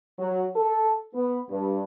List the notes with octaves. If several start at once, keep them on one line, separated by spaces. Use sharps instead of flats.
F#3
A4
B3
G2